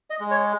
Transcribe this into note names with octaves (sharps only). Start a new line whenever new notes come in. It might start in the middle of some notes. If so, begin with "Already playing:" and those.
D#5
G#3
C#5